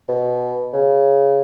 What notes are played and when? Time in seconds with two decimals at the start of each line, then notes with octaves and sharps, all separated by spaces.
0.08 B2
0.73 C#3